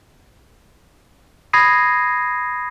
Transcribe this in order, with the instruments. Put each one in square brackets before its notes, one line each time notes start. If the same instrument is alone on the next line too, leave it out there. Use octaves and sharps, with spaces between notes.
[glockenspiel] B5 D#6 G#6 A#6 C7 D#7